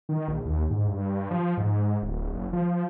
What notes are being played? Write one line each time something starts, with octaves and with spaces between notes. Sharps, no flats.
D#3
A#1
D#2
G#2
G2
F3
G#2
D1
F#1
F3